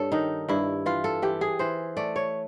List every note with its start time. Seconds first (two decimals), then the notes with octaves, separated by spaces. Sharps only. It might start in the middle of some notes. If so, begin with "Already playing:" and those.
Already playing: G2 A4 C#5
0.12 D#3 D#4
0.49 G2 E4
0.86 E3 F4
1.04 A4
1.22 E3 G4
1.41 G#4
1.59 E3 C5
1.97 A3 D5
2.16 C#5